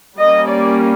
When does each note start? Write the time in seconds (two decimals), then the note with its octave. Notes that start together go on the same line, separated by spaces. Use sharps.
0.18 G3 A#3 C#4 D#5
0.48 D5